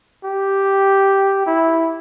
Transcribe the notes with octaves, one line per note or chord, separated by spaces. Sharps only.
G4
E4